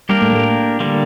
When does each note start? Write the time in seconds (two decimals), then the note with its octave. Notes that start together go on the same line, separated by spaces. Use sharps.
0.09 G3 A#3 D4 G4 A#4
0.22 A2 A3
0.33 A2 A3
0.80 D3 G3 A#3